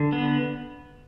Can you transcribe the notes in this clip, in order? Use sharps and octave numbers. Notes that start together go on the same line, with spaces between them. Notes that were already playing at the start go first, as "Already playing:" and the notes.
Already playing: D3
B3